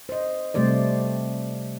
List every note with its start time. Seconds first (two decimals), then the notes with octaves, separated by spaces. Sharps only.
0.09 C5 D#5
0.54 C3 G3 A3 G4 C5 D5